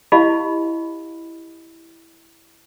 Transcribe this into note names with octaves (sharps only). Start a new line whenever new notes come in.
E4 G4 D#5 F5 B5